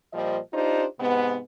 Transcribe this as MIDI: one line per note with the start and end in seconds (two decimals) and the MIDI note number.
0.13 0.39 46
0.13 0.39 53
0.13 0.39 55
0.13 0.39 72
0.13 0.39 75
0.53 0.85 62
0.53 0.85 63
0.53 0.85 65
0.53 0.85 67
0.53 0.85 72
1.00 1.39 44
1.00 1.39 48
1.00 1.39 59